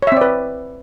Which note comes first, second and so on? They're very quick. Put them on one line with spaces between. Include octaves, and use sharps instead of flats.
C#5 E5 C4 D5 B4